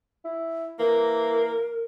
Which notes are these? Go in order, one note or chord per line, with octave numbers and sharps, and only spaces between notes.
E4
E3 A#3 A#4